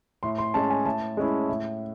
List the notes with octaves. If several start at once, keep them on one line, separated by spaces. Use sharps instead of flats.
A2 C6
C6
G#3 C#4 A5
G#5
A2 A5
G#3 C#4 E4
A2